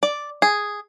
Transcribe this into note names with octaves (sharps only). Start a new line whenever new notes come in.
D5
G#4